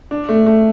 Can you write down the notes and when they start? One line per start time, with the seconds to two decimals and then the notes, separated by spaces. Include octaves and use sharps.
0.11 D4
0.29 A3
0.46 A3